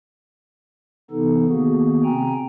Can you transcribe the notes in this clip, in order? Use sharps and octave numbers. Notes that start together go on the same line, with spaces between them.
C3 E3 B3 D#4 A4
D#3 A#3 B3 F#4 G#4
C3 C4 G5 G#5 A#5